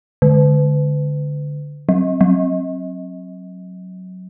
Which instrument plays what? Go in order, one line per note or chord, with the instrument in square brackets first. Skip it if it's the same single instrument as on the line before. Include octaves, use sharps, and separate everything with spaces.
[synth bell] D3
F#3
F#3